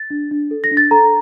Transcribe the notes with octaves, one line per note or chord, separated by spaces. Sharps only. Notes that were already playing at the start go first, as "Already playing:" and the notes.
Already playing: A6
D4
D4
A4
A#6
D4
A6
A4 A#5